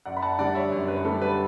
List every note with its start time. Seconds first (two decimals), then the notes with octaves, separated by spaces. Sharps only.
0.06 F#2 D5 F#5
0.17 B5
0.22 F#5 A5
0.39 D3 G3 D5 F#5
0.55 C#5 E5
0.72 F#2
0.88 B4
1.05 D3 G3 A4
1.21 B4